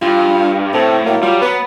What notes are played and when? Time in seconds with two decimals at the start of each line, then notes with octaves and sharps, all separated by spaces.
0.02 G2 F4
0.74 A2 C4 A4
1.06 F#3 A#3
1.23 G3 F4
1.41 B3 B4